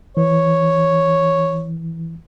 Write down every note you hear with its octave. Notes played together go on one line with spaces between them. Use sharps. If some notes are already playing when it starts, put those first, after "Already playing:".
E3 C#5